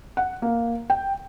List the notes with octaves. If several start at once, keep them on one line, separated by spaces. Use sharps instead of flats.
F#5
A#3
G5